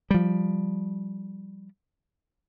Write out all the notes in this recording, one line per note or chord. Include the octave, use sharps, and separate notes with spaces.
F3 G3